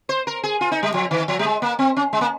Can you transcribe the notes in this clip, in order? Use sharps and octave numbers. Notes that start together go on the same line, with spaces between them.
C5
A#4
G#4
F4
D#4
G3
F3
D#3
F3
G3
G#3
A#3
C4
C#4
G#3
A#3